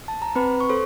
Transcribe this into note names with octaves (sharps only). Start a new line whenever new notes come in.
A5
A#5
C4 B4 B5
C#6
A4 C5 C6